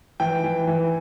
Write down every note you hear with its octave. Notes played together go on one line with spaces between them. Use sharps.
E3 G5
E3
E3